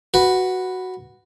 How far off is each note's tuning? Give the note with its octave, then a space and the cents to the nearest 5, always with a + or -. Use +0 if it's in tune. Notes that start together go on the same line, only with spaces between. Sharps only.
F#4 +0 B4 +0